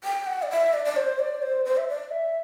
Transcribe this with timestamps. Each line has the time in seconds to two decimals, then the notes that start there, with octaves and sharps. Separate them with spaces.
0.04 G5
0.27 F#5
0.42 D5
0.51 E5
0.74 D5
0.85 D5
0.96 C5
1.19 D5
1.42 C5
1.65 C5
1.77 E5
1.88 D5
2.11 E5